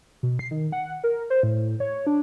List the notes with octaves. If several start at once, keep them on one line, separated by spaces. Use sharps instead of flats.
B2
C7
D#3
F#5
A#4
C5
A2
C#5
D4